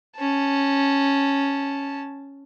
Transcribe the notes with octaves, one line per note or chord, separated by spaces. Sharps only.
C#4 A5